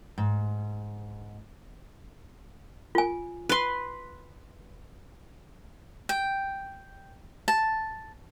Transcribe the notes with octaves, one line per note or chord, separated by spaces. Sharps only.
G#2
F4 G#5
B4 C6
G5
A5